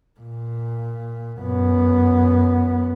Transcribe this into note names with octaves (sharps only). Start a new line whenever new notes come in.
A#2
F#2 B3